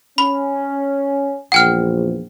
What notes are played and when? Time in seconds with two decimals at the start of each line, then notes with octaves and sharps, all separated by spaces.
0.18 C#4 B5
1.52 A#1 E2 F#5 G5 F6